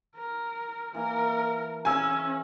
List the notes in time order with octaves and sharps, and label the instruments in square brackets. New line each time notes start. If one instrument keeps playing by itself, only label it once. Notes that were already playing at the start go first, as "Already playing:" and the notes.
[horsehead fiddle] A#4
[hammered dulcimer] E3 A#3 [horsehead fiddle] A#4
[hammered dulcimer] A5
[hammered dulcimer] C#3 E3 [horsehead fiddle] C#4 [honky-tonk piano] G#5 E6